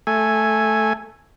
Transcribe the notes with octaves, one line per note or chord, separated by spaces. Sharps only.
A3 G#5